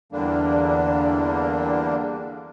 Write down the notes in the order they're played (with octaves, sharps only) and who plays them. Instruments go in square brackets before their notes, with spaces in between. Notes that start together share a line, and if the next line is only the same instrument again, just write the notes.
[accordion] E2 D3 G3 A#3 D4